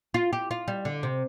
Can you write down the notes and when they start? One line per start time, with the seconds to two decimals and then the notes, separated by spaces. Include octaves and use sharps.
0.14 F4
0.33 G4
0.51 F4
0.68 G3
0.85 D3
1.03 C3